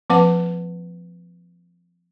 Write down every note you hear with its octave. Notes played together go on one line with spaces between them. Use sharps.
F3 A#3 C4 B4 F#5 D6